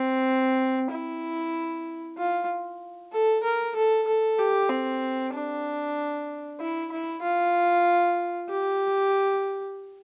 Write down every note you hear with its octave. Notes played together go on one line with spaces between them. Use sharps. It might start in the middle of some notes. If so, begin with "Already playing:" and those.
Already playing: C4
E4
F4
A4
A#4
A4
A4
G4
C4
D4
E4
E4
F4
G4